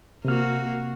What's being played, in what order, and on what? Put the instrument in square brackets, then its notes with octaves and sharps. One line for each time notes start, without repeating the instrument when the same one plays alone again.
[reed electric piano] C3 F6 [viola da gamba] A#3 F#4